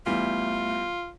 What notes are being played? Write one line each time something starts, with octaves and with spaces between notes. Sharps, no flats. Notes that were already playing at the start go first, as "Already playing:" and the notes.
E2 E3 G3 A3 F4